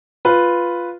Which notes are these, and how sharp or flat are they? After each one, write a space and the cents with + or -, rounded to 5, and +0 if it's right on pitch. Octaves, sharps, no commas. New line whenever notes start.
F4 +0 B4 +0